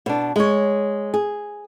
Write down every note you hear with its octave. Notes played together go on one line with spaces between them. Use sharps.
B2 D4
G#3 C#5
G#4